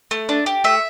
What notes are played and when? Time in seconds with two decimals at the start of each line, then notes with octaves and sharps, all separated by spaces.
0.11 A3
0.29 D4
0.46 G4
0.64 A3 E5